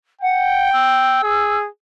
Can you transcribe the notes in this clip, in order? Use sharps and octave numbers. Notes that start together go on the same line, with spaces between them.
F#5 G5
E6
G#4